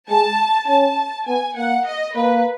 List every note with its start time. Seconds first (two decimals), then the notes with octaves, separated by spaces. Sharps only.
0.09 G#3 A5
0.68 C#4 A5
1.27 B3 G#5
1.57 A#3 F#5
1.87 D#5
2.16 A#3 B4